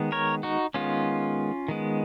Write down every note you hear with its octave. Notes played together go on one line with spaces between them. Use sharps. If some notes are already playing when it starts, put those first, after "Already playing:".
Already playing: D#3 G#3 B3
A#4 C#5
D#4 F#4
D#3 G#3 B3 C#4 F4
D#3 G#3 B3